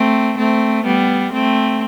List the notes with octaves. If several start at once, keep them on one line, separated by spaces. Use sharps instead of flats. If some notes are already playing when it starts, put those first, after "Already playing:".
Already playing: A3 C4
A3 C4
G3 B3
A3 C4